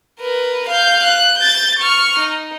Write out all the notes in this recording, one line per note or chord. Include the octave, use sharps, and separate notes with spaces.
A#4 B4
F5 G6
F#6
G6 A6
C#6 F6
D#4